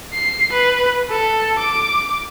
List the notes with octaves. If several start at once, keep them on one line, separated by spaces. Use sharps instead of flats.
C7
B4
A4
D6